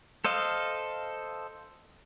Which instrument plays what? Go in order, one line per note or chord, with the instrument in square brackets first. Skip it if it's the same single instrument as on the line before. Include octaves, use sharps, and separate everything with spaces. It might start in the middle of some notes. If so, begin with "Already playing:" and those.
[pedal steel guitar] A4 C5 D#5 F5